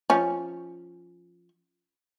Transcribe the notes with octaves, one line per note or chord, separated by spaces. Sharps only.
F3 C#4